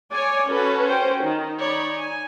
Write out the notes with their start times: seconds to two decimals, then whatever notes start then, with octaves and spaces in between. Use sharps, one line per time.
0.12 C#5 D5 G#5
0.50 C#4 F#4 A4 B4
0.89 C5 G5
1.23 D#3 D#4
1.59 C#5 D5 B5
1.95 G#5